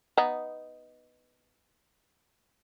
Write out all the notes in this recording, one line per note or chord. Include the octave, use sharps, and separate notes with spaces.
B3 D#4